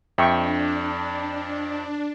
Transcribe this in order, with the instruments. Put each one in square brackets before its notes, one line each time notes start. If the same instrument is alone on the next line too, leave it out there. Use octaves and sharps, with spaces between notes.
[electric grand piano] F2 [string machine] D4 [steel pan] E5 G5 C#6